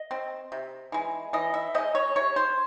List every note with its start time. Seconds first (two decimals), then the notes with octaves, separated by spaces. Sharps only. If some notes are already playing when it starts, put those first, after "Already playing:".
Already playing: D#5
0.11 C4
0.52 C3
0.92 E3 G#3
1.33 E3 D#5
1.54 E5
1.75 G#3 C4 D#5
1.95 C#5
2.16 C3 C#5
2.36 C5